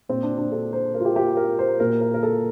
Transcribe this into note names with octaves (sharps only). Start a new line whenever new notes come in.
A#2 C4
D4
D4
A4
C5
A#4
F4
G4
G4
A#4
C5
A#2 A#4
A#4
A#4
A4